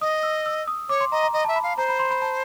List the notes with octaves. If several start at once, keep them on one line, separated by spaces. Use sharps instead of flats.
D#5 D#6
E6
E6
D#6
C#5 D6
C6
D#5 A#5
A#5
D#5 A#5
A5
E5
B5
F5
C5 A#5
B5
C6
B5
A5